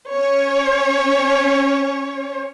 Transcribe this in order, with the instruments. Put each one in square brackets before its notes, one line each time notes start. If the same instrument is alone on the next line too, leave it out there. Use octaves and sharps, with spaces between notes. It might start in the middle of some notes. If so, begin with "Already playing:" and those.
[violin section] C#4 C#5